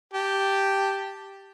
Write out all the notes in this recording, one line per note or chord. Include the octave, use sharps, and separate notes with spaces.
G4 A5